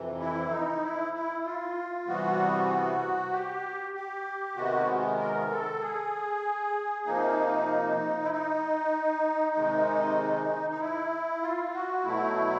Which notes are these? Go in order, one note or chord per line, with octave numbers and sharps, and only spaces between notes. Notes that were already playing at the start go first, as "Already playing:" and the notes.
Already playing: F2 C3 E3
E4
D#4
E4
E4
F4
C3 E3 G3 B3 F#4
G4
G4
C3 D#3 G#3 B3 F#4
A#4
A4
G#4
C3 F3 A#3 D#4
E4
D#4
C3 D#3 G#3
D#4
E4
F4
F#4
B2 F#3 A3 E4